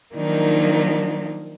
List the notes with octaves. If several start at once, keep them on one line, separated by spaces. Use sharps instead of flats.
D#3 F3 F#3 A#3 D4 D#4